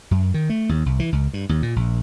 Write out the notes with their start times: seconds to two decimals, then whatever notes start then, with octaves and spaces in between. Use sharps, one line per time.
0.11 F#2
0.34 D#3
0.49 A3
0.69 D#2
0.86 C2
0.99 E3
1.12 C#2
1.33 G2
1.49 D#2
1.63 A#2
1.76 A#1